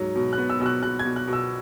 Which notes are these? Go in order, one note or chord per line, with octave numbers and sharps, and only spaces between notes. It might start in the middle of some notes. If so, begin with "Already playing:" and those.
Already playing: G#2 F#3
B2
F#6
B3
E6
B2 E6
F#6
B2 F#6
G#6
B2
F#6
B2
E6